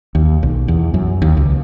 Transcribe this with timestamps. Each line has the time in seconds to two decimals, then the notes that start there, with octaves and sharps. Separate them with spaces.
0.15 D#2
0.43 B1
0.68 E2
0.94 F#2
1.22 D#2
1.37 C#2